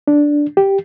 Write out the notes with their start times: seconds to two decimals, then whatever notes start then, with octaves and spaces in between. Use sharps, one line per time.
0.08 D4
0.57 G4